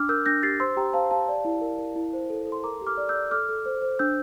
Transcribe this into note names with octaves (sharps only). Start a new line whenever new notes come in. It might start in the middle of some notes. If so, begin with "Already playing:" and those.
Already playing: D4 D6 F6
A#4 E6 G6
D4 G6 A#6
G4 A6 C7
C5 C6 E6
G4 G5 A#5
C5 F5 A5
G4 F5 A5
D5
E4
A#4
A#4
E4
C5
A4
A4
C6
A#4 A#5 D6
G4
D6 F6
D5
E6 G6
D5
A4 D6 F6
A4
C5
C5
D4 E6 G6